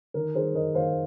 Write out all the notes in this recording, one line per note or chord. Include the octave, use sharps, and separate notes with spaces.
D#3 A#4
D#3 G#4 C5
D#3 A#4 D#5
D#3 C5 F5